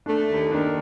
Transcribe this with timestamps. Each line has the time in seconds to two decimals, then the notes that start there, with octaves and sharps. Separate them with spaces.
0.06 A3 D4
0.29 D#2
0.51 D#3 D4